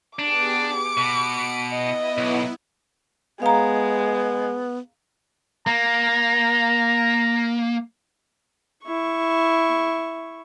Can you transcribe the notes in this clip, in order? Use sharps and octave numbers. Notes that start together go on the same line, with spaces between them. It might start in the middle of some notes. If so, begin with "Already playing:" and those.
B3 D4 G4 G#4 D6
C#7 D7
B2
B3 E4 D#5
B1
G#3 B3 F5 A#5
A#3 A#5
E4 C#6